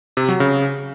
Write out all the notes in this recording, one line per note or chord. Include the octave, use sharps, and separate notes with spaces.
C3
F#3
C#3